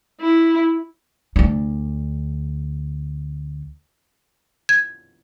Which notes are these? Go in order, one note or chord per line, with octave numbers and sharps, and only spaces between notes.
E4
D2 D4
G#6